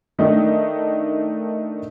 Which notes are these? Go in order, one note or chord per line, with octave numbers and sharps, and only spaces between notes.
D#3 A3 D4 D#4